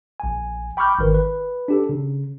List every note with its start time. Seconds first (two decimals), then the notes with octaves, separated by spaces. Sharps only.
0.20 A#1 G#5
0.77 G5 B5 C#6 D6 F6 G6
0.99 G#1 D#3 A#4 B4
1.14 B4
1.68 D4 G4 A4
1.89 C#3